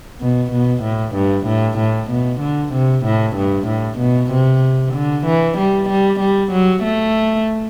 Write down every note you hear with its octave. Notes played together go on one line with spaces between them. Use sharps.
B2
B2
A2
G2
A2
A2
B2
D3
C3
A2
G2
A2
B2
C3
D3
E3
G3
G3
G3
F#3
A3